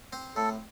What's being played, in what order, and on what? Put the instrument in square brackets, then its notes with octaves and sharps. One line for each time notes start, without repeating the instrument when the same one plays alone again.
[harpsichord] C4
[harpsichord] A2 [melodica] A4